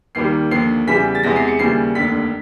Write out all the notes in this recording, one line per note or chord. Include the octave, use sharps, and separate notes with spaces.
D#2 D#3 G3 A#3 C7
D#2 D3 F3 C7
E2 C#3 E3 G3 B6
A6
E2 C3 E3 G#3 A#6
C7
C#7
D#2 C#3 E3 G3 C7
F1 D#2 D3 B6